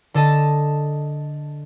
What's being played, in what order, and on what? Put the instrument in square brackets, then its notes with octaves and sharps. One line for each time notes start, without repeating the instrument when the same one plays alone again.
[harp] D3 A4 D#5 A5